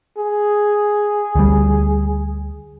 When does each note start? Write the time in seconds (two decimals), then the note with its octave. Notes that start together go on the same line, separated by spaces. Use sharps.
0.18 G#4
1.35 D2 G3